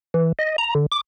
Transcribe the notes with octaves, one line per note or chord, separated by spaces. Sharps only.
E3
D#5
A#5
D3
D6